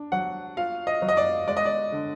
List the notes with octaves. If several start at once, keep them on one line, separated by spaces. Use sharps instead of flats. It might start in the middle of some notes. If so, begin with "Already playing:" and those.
Already playing: D4
F#3 F#5
F4 F5
D#5
F#3
D#5
D5
G#3 D5
D#5
D5
D3